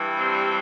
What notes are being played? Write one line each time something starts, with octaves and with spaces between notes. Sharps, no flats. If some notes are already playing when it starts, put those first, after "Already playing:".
Already playing: G2 E3 G3
C4